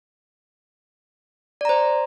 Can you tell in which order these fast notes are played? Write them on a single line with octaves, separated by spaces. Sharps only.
D5 A#5 C5